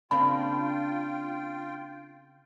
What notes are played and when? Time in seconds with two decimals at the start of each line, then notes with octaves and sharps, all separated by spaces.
0.11 C#3 A#3 C4 D4 F4 G5 B5